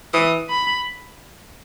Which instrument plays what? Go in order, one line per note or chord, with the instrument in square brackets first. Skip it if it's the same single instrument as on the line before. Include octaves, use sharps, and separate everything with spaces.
[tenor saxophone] E3 [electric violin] D#6
[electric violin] B5